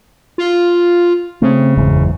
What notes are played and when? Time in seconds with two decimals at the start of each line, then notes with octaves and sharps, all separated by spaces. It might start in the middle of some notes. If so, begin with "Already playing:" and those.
0.38 F4
1.42 C#3 A3 C4
1.77 F#1 E2 G#2